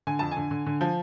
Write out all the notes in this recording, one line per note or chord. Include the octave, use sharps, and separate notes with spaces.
D3 G#5
F2 A5
G#5
D3
D3
D3
F3